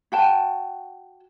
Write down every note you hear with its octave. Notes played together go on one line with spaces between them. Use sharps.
F#4 G5 A5